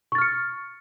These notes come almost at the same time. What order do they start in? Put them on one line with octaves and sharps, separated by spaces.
C#6 A6 F6 C#7